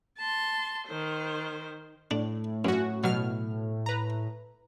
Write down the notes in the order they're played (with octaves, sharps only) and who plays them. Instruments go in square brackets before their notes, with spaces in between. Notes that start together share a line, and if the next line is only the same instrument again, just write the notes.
[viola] A5 C6
D#3 C5
[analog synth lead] A2 [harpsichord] D4
[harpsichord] F#2 [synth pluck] C#4 F#4
[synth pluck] B2 F6 [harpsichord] F#3
[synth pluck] B4 A#5